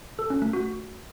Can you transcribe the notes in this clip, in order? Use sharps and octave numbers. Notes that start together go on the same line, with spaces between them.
A4
C#4
A3
F#4